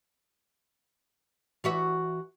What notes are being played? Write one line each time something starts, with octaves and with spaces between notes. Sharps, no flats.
E3 F#4 E5